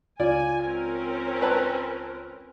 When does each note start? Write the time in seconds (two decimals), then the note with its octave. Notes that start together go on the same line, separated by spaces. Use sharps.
0.20 C#2 F4 D5 G#5
0.63 C4 C#4 A#4
1.42 B4 A5